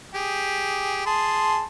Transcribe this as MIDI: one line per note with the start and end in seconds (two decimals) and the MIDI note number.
0.14 1.02 67
0.14 1.02 68
1.06 1.63 68
1.06 1.63 81
1.06 1.63 84